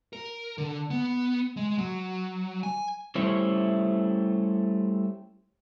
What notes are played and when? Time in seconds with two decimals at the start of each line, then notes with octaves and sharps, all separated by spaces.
0.13 A#4
0.58 D3
0.90 B3
1.57 G#3
1.78 F#3
2.63 G#5
3.15 G3 A3 C#4 E4 C5 C#5